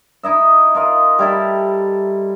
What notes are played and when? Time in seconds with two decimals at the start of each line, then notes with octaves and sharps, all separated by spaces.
0.23 D#4 E4 D#5 E5
0.75 F4 A#4 D#5
1.19 G3 E4 A4